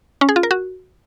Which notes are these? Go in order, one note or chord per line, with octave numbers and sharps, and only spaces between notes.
C#4
G#4
F4
A#4
F#4